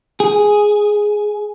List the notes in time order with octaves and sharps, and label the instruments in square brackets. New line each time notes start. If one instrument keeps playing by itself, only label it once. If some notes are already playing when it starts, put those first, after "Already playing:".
[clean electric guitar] G#4